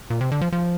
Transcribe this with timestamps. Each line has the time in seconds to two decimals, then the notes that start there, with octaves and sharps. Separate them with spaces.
0.10 A#2
0.21 C3
0.32 D3
0.41 F3
0.52 F3